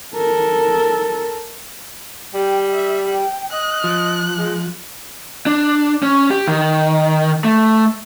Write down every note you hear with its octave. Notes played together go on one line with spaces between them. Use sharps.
A4 A#4
G3 G5
E5
G5
D#5 F#6
F3
G#3
D4
C#4
G4
D#3
A3